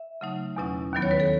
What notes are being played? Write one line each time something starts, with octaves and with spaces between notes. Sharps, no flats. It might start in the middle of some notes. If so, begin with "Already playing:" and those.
Already playing: E5
C#3 F#3 A3 D#4
E2 B2 F#3 C#4 E4
D#2 D#3 F#3 B3
C#5
B4
A4